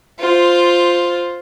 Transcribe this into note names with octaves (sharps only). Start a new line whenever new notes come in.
F4 C5